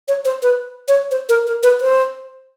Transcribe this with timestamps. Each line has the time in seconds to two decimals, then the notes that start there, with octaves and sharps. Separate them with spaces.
0.08 C#5
0.25 C5
0.43 B4
0.88 C#5
1.11 C5
1.29 A#4
1.47 A#4
1.63 B4
1.81 C5